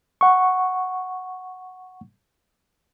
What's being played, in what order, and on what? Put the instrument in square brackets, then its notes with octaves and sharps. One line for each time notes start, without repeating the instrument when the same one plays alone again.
[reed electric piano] F#5 C#6